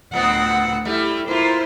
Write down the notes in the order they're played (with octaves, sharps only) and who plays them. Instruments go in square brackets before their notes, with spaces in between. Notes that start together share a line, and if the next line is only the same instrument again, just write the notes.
[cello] D2 F#5 [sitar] A2 B3 C4
[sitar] G3 A3 [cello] E4
[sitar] A#3 F4 [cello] E4 C5